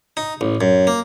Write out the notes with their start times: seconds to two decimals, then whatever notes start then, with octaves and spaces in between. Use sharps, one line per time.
0.17 D#4
0.41 A1
0.61 F#2
0.87 A#3